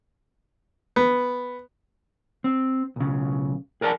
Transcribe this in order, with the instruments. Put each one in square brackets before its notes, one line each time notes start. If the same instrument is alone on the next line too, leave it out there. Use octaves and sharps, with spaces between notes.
[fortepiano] B3
[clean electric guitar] C4
B1 C#3
G#4 A#4 D5 F5 A5